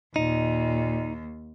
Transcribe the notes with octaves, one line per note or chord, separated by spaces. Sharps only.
D#2 A#2 D#4